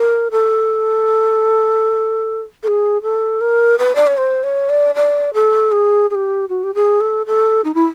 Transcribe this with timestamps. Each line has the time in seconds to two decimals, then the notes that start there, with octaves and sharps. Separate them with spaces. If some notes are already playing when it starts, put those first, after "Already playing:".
Already playing: A#4
0.31 A4
2.63 A4
2.68 G#4
3.03 A4
3.41 A#4
3.79 B4
3.95 D5
4.07 C#5
4.18 C5
4.43 C#5
4.69 D5
4.95 D5
5.34 A4
5.72 G#4
6.10 G#4
6.15 G4
6.49 F#4
6.64 G4
6.75 G#4
7.01 A4
7.27 A4
7.65 D#4
7.75 E4